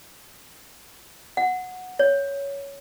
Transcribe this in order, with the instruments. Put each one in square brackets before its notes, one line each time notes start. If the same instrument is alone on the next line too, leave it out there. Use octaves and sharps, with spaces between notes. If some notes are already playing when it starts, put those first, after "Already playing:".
[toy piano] F#5
C#5